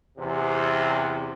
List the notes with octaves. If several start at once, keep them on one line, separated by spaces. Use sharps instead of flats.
E2 C3